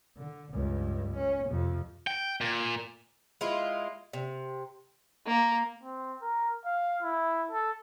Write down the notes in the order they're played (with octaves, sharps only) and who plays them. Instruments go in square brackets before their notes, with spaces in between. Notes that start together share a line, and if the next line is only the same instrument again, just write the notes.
[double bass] D3
C#2 G2
C#4
F2 C3
[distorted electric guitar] G5
A#2
[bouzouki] G#3 E4 F4
C3
[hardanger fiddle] A#3
[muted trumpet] C4
A#4
F5
E4
A4